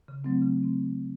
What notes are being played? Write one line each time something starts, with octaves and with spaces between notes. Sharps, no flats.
C#3
F#3 A3 C4
C#3
F#3 A3 C4